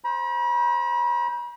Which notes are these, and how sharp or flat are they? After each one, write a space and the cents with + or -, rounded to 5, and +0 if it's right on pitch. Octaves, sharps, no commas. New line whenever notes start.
C5 +0 B5 -45